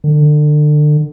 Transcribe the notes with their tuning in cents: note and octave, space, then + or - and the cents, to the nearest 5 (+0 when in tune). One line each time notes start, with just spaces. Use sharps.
D3 +30